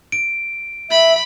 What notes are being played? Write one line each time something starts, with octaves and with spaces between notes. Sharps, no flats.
D7
E5 B5